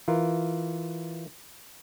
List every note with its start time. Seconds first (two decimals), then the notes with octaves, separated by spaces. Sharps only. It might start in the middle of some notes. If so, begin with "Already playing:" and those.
0.08 E3 F4 A#4